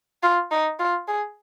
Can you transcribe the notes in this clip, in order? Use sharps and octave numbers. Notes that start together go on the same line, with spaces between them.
F4
D#4
F4
G#4